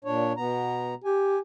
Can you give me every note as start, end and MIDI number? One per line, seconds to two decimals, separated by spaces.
0.04 0.33 46
0.04 0.33 62
0.04 0.33 73
0.37 0.94 47
0.37 0.94 59
0.37 0.94 82
1.05 1.38 67
1.05 1.39 80